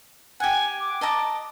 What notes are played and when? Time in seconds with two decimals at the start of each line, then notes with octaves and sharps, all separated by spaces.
0.40 G4 F#5 G#5
0.80 D6
1.01 D#5 A5 A#5